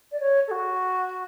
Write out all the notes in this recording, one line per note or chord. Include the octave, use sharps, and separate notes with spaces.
D5
C#5
A4
F#4